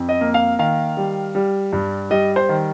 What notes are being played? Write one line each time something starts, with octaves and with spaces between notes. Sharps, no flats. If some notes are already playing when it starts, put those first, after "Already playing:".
Already playing: F2
D#5
A#3
F5
D#3 F5
G3
G3
G2
G3 D#5
C5
D#3